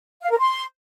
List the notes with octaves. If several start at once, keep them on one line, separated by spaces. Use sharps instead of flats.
F5
A#4
C6